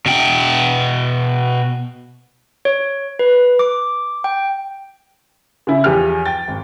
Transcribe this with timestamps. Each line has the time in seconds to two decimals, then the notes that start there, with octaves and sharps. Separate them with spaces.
0.06 B2 G5
2.65 C#5
3.19 B4
3.59 D6
4.24 G5
5.67 C#3 E4
5.84 E2 F3 G4 G#4 F6
6.25 G5 A6
6.48 G#1